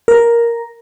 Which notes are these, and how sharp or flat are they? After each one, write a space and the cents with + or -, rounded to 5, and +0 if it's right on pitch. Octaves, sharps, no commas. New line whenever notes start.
A#4 +5